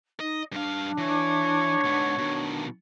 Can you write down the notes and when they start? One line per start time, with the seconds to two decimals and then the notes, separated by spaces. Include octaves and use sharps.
0.20 D#4 D#5
0.52 G2 D4 F5
0.98 E3 C#5
1.85 G#2 B3
2.18 B2 D#3 D4